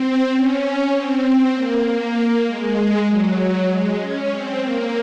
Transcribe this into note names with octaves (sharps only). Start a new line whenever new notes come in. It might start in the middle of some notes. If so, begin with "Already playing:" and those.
Already playing: C4
C#4
C4
A#3
A#3
G#3
F#3
G#3
C#4
C4
A#3